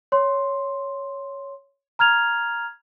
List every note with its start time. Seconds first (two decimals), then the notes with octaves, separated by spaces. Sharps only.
0.12 C#5 C6
1.99 A#5 F6 G#6 F7